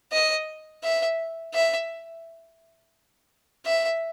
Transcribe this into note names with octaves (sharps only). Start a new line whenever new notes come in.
D#5
E5
E5
E5